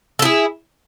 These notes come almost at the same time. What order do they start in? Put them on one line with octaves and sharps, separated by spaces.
A4 E4 G#4